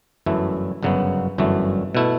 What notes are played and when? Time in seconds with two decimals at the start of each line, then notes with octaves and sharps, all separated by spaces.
0.26 G1 F#2 E3 A3 E4
0.83 G1 F#2 C#3 F#3 B3
1.38 G1 F#2 E3 A3
1.95 B2 A3 E4